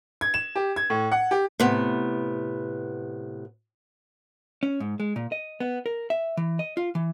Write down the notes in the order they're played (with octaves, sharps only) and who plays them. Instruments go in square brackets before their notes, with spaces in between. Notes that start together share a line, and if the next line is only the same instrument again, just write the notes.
[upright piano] G#6
E7
G4
G#6
A2
F#5
G4
[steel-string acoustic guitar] A2 C3 B3
[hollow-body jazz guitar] C#4
G#2
G#3
A#2
D#5
B3
A#4
E5
E3
D#5
F4
E3